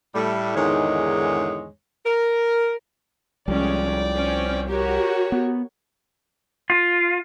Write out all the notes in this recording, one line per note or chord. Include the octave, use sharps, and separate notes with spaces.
A2 G3 A3
E2 G#2 D3 D#3 G#3 C#5
A#4
C2 F3 G3 G#3 C#4 D5 G5
C4 C#4
F#4 G4 A#4 C#5
B3
F4